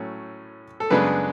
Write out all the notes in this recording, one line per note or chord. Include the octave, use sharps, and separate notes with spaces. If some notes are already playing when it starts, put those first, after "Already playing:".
Already playing: A2 F#3 A3 C#4
A4
F#2 C#3 G#3 B3 D4 B4